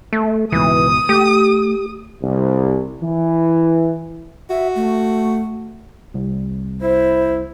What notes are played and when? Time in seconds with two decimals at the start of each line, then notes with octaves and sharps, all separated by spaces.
0.13 A3
0.52 C#2 G#2 B2 E3 D#6
1.09 A3 G4
2.22 C2
3.02 E3
4.50 F#4 E5
4.75 A3
6.14 C2
6.81 E4 C5